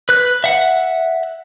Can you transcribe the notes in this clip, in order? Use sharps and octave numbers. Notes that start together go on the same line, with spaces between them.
B4 F#6
E5 F#5